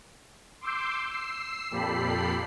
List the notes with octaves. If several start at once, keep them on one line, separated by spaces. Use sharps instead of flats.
C6 D6 E6 G6 C7
E6 C7
F2 A#2 G4 A4 B5 C7